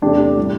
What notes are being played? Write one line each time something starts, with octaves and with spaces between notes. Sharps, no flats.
E2 C3 A3 D4 G4
A2 G3